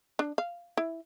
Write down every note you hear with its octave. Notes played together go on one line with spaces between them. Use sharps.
D4
F5
E4